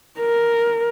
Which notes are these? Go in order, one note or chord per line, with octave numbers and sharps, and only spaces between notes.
A#4